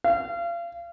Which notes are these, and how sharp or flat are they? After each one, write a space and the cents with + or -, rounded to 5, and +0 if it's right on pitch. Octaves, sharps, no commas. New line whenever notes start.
F5 -35